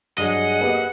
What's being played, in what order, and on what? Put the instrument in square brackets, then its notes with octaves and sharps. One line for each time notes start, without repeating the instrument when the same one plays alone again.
[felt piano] G2 F#3 [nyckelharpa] G#4 [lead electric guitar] D#5 [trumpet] F#5
[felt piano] A#3 B3 G4